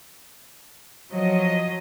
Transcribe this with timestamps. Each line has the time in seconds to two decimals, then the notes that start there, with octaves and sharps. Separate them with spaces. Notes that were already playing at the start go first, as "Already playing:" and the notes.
1.13 F3 F#3 D#5